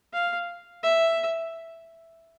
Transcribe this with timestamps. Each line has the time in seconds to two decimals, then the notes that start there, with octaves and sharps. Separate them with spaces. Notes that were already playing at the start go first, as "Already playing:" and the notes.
0.13 F5
0.83 E5